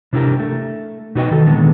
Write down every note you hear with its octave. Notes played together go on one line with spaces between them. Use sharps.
C3 D4 E4 G4 A#4
A3
B2 D#4 F#4 B4 D#5 G5
D#3 A4
A#2 D3 D#3 G#3 B3